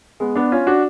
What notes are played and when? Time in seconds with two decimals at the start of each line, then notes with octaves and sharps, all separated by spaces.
0.20 G#3 B3
0.35 B3 D4
0.52 C#4 F4
0.67 D4 F#4